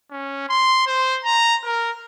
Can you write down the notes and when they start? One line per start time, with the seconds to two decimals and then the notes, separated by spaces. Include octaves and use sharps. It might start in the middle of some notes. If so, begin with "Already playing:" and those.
0.11 C#4
0.49 C6
0.87 C5
1.24 A#5
1.65 A#4